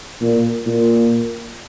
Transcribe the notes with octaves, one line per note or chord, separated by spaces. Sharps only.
A#2
A#2